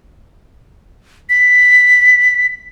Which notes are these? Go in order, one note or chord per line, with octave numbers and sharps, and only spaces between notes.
B6